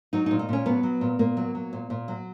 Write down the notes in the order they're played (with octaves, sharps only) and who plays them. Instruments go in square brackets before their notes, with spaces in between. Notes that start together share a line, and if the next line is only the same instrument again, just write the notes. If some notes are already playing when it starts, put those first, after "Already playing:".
[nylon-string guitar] F#3 D#4
D#4
A#2
D#4
A#2 C#4
F#3 B3
F#3
A#2
A#2 A#3
F#3
F#3
A#2
A#2
F#3